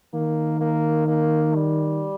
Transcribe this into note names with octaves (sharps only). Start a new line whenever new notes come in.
D#3 A#3
A#3
A#3
G3